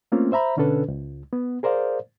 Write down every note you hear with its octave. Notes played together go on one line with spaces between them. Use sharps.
A3 A#3 C4 C#4 F4
C5 E5 A#5 B5
B2 D3 C#4 D4 A4 B4
C#2
B3
G#4 A#4 C5 D5 F5